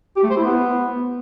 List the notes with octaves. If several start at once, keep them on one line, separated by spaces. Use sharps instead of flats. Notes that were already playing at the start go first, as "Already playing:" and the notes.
G4
A3
C5
E4
B3